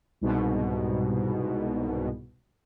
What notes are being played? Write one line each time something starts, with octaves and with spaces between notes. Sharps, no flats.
C2 G#2 B2